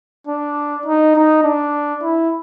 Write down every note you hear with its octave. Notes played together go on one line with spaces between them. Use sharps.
D4
D#4
D#4
D4
E4